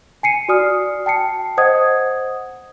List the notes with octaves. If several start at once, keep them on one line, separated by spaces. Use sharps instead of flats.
G#5 C7 C#7 D#7
F#4 D5 G#5 D#6 F6
G5 A5 C7 C#7
C5 D#5 F#5 D#6 G#6